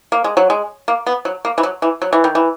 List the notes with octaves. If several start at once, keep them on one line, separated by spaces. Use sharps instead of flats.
A#3
G#3
F#3
G#3
A#3
B3
F#3
A#3
E3
F#3
E3
F#3
E3
D#3
E3